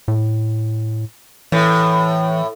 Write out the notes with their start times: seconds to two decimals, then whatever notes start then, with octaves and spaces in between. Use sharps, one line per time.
0.08 A2
1.52 A2 E3